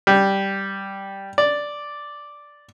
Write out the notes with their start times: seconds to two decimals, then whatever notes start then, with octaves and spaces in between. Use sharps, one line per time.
0.07 G3
1.38 D5